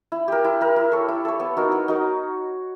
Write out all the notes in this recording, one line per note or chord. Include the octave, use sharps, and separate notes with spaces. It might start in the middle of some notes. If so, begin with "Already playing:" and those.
E4
G4 A#4
E4
G4 A#4
E4
A4 C#5
E4
A4 C#5
B3
D#4 F#4 A#4
B3
D#4 F#4 A#4